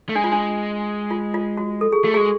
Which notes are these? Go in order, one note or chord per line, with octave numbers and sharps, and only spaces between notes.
A3
G#3 D4
F4
D4
F4
F4
F#4
A4
G#4
A3 F#4
G#3 G#4